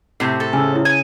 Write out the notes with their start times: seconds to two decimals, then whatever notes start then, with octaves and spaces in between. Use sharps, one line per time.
0.20 A2 C3 G6 G#6 C7
0.40 A4
0.53 C#3 G#5 E6
0.72 E4 C#5
0.85 G#5